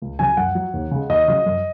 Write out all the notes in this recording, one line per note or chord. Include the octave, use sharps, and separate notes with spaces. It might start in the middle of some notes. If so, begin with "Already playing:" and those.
C#2
C#3 F#3 G#5
F#2 F#5
F#3
D#2
C#3 G#3
D#2 D#5
C#3 F#3
F#2